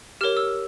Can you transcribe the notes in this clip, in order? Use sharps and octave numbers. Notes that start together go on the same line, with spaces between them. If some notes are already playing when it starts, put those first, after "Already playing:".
G4 A#4 C#5 F6
E6